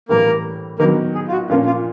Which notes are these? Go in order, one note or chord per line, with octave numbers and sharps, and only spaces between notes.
A2 E3 G3 A#3 A#4
D#3 F#3 A#3 B3 A#4
G#4
F4
F#4
A#2 F3 A#3 C#4 F4
F4